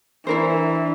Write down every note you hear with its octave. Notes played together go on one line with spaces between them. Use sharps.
E3 D4 E4 A#4 C5